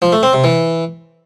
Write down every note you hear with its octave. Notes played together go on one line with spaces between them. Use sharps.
F3
A3
C4
C3
E3